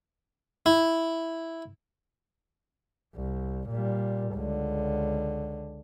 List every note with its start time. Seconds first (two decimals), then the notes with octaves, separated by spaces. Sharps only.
0.66 E4
3.15 C2
3.70 A#2 G3
4.34 C#2 D3